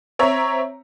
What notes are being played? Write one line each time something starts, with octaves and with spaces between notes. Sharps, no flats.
C4 C#5 E5 A#5